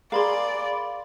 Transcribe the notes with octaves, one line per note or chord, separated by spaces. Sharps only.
G#4 A#4 D5 F5 B5 C6